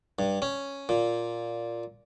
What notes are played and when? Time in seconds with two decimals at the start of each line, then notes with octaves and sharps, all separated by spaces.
0.19 G2
0.42 C#4
0.89 A#2